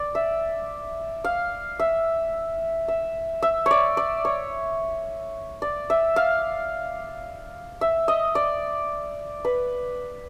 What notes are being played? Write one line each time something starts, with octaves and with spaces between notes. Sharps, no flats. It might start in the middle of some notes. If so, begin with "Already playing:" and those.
Already playing: D5
E5
F5
E5
E5
E5
C#5 D5
D5
C#5
D5
E5
F5
E5
D#5
D5
B4